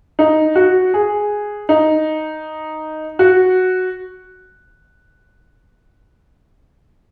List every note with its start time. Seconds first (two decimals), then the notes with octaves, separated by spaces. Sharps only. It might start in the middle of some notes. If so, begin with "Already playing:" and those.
0.19 D#4
0.55 F#4
0.94 G#4
1.69 D#4
3.19 F#4